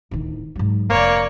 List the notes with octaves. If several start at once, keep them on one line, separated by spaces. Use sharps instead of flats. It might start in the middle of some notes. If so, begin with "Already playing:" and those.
D1 D#3
G#2 F#3
F1 A#3 C#5 D5